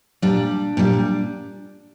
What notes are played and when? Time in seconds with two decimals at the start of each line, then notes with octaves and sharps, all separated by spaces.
0.22 A#2 G3 D4
0.77 A#2 G3